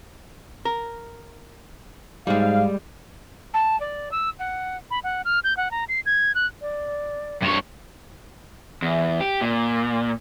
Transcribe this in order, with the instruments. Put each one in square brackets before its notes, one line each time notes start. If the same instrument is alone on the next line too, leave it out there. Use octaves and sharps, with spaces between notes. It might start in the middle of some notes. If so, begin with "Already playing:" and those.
[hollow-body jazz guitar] A#4
[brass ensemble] G#2 F5 [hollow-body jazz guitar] G3 G#3
[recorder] A5
D5
E6
F#5
[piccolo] B5
F#5
F6
G6
F#5
A#5
C7
G#6
F#6
[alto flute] D5
[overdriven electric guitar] G2 C#5
[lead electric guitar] E2
G4
A#2